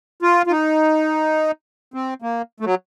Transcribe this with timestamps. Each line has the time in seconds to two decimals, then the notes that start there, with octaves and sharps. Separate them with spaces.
0.22 F4
0.47 F4
0.51 D#4
1.94 C4
2.22 A#3
2.60 A3
2.65 F#3